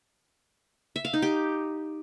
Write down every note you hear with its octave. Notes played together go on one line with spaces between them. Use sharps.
E5
F5
D#4
G4